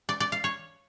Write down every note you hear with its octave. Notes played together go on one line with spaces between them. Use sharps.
D5
D5
F5
C#5